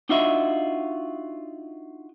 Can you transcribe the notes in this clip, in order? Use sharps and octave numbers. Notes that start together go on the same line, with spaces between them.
D4 D#4 F4 F#4 D#5 E5